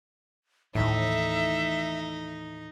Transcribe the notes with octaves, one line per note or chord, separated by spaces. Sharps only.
D#2 A2 E3 D#4 E5